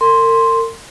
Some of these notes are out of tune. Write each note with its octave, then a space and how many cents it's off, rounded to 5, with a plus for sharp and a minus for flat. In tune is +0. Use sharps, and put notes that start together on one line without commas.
A#4 -40 C6 +0